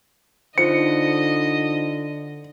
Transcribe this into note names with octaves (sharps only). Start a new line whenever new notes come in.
D3 D#4 F4 C5 D#5 C#7